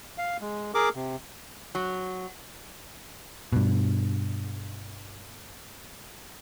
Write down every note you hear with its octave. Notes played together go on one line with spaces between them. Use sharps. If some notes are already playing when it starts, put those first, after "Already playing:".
F5
G#3
G#4 A#4 D6
C3
F#3
G2 B2